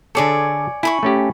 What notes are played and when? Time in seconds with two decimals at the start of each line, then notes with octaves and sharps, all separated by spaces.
0.15 D3 G#4 A4 C#5 D5 G#5
0.83 E4 G#5 B5 C#6
1.03 A3 C#4 G4